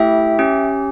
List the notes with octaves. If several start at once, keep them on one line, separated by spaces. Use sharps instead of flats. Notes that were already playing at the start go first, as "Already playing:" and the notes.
Already playing: A3 E4 G4 E5 G5
C#4 G4